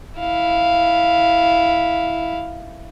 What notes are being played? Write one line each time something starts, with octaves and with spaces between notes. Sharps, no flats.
E4 F5